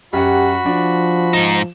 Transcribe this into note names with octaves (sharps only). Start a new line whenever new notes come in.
F#2 F#4 G4 F#5 B5
F3 D4
G#2 D#4 E7